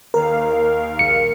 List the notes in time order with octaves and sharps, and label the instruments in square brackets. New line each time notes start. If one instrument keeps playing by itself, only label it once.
[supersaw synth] D#2 F5 [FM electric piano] A#4
[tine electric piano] A#1 C#7